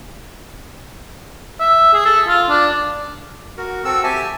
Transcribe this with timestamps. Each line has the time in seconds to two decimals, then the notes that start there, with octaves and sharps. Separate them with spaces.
1.60 E5
1.94 G#4
2.06 A4
2.28 F4
2.49 D4
3.58 F#4 A#4
3.85 C4 F#4 A4 E6
4.04 G4 E5 G#5 A5